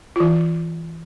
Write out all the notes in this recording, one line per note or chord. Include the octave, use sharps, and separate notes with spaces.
E3 F4